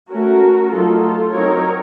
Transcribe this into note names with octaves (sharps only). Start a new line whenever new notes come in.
A3 C#4 F#4 A#4
F#3 A3 D#4 F4 A4
F4 A4
F#3 C4 D#4 A#4 C#5